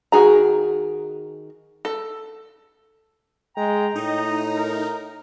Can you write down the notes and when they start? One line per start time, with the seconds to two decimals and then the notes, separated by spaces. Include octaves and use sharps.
0.12 D#3 F#4 G#4 A#5
1.85 A4
3.57 G#3 G5 A#5
3.95 A2 D#4 D#5
4.56 A#4